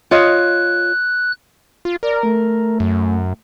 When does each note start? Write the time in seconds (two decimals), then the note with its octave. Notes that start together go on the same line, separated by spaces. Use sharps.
0.11 F4 C#5 D#5 F#6
1.85 F4
2.03 A#4 D5
2.23 A3
2.80 F#2